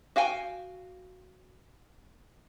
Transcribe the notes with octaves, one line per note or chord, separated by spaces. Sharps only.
F#4 F5 G5 G#5